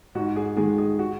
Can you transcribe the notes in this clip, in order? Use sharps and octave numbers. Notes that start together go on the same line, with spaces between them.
G#2 F#4
G#4
D#3 G#3 G#4
G#4
F#4